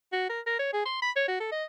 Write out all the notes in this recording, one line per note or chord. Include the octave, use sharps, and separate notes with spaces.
F#4
A#4
A#4
C#5
G#4
C6
B5
C#5
F#4
A4
D#5